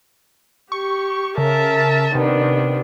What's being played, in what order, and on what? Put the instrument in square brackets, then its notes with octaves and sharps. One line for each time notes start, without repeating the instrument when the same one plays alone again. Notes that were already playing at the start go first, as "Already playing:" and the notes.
[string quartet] G4 [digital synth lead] C#6
[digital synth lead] C#3 [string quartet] A#4 E5 A5
[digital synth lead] C3 [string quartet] D#3 B3 D4